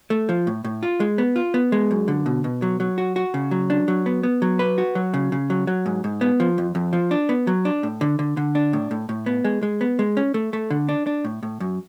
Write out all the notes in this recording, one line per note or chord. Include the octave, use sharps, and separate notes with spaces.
A3
F3
A2
A2
F4
G#3
B3
F4
B3
G#3
F#2
D3
B2
B2
F#3
F#3
F#4
F#4
C#3
F#3
D4
F#3
B3
B3
F#3
B4
F#4
F#3
C#3
C#3
F#3
F#3
G#2
G#2
B3
F3
F2
F2
F3
D4
B3
F#3
D4
A2
D3
D3
D3
D4
A2
A2
A2
B3
G#3
G#3
B3
G#3
C#4
A3
A3
D3
D4
D4
A2
A2
F#2